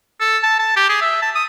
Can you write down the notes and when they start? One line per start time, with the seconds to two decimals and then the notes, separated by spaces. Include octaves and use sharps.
0.21 A4
0.43 A5
0.59 A5
0.76 G4
0.89 G#4
1.02 E5
1.22 A5
1.35 D#6